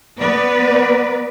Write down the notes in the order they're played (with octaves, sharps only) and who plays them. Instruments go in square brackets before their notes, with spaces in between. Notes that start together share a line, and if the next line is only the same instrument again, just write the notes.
[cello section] B3 B4 D5